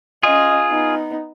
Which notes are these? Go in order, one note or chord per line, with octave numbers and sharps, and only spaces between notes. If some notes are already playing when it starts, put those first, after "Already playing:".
C#4 F4 G#4 D#5
B3 D#4